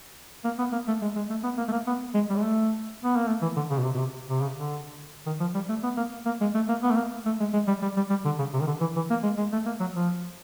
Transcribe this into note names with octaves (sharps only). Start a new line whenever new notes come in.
A#3
B3
A#3
A3
G#3
G#3
A3
B3
A#3
A3
A#3
B3
G#3
G3
G#3
A3
B3
A#3
A3
E3
D3
C#3
B2
C3
B2
C3
C3
C#3
D3
D#3
F3
G3
A3
B3
A#3
A#3
G#3
A3
A#3
B3
A3
A#3
A3
G#3
G#3
G3
G3
G3
G3
D3
C#3
C3
D#3
D3
E3
E3
A#3
G#3
G#3
A3
A#3
F#3
F3